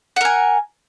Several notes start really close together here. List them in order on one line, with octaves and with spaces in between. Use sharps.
F#5 A#4 G#5